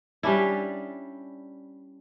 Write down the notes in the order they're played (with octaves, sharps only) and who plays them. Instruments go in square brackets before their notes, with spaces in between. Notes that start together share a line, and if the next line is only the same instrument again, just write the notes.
[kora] G3 C#4 D4 E4